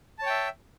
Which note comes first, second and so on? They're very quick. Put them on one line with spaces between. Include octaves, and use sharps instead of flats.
A5 C#5 G5 E5